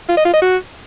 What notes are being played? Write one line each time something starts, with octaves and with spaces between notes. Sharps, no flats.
F4
D#5
F4
D#5
F#4